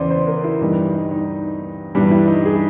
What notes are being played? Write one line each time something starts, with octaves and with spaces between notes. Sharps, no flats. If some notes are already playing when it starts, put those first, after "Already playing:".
Already playing: E2 C#3 E3 C5 D5
C5
A#4
E4
G2 E3 G3 D#4
D#4
D#4
G2 E3 G3 D4
E4
D#4
G#4